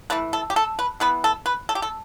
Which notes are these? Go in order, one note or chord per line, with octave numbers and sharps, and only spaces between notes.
E3 A3 B4
A4
G4
A4
B4
E3 B3 B4
A4
B4
A4
G4
A4